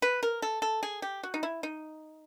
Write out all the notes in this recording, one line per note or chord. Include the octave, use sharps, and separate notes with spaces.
B4
A#4
A4
A4
G#4
G4
F#4
D#4
E4
D#4